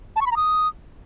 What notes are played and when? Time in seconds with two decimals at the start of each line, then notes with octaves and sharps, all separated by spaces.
0.16 A5
0.21 C#6
0.26 B5
0.31 A#5
0.36 D#6